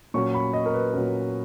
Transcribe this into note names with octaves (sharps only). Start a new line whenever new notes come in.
A#2 F#3 C#4 C#6
B5
D#5
A#4
B4
A#2 F#3 C#4 A#4